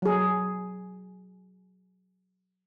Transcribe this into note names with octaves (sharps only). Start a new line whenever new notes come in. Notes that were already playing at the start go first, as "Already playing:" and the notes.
F#3 G#4